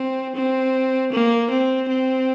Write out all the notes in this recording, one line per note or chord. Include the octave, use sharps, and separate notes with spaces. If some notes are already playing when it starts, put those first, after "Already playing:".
Already playing: C4
C4
A#3
C4
C4